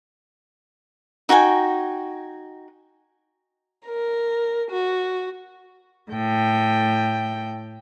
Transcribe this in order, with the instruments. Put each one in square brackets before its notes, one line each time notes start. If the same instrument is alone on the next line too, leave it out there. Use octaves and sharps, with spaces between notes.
[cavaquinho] D#4 F#4 G5 G#5
[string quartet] A#4
F#4
[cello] A2 G5